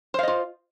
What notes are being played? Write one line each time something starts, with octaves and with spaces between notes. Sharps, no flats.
F4 C5 D#5 F5